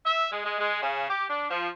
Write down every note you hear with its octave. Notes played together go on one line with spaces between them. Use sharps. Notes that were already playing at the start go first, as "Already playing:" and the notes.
E5
G#3
G#3
G#3
C#3
G4
D4
F3